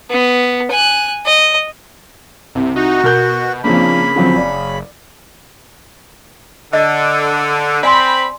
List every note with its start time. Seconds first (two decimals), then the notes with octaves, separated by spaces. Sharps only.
0.10 B3
0.71 G#5 F#6
1.26 D#5
2.55 C2 C3
2.76 D#4 F#4
3.04 B2 A#4 F#6 G6
3.64 C#3 F3 A#3 C4 D4 B5
4.16 D3 F3 F#3 C4
4.36 F#1 D5
6.73 D3 D#5
7.83 C4 D5 G#5 B5 C6